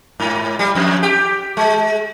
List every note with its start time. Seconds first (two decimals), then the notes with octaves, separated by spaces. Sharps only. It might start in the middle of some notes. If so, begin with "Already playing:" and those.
0.20 G#2
0.59 G3
0.75 F2
1.03 G4
1.57 G#3